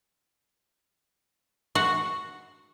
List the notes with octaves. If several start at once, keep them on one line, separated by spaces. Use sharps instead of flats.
F#4